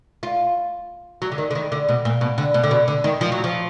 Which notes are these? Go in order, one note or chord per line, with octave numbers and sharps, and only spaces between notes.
F4
F#3
D3
D#3
D3
D#3
D3
B2
A#2
B2
D3
B2
D3
B2
D3
D#3
F3
F#3
F3